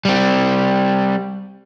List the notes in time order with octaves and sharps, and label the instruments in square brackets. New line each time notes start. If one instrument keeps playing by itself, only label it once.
[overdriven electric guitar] G3 C4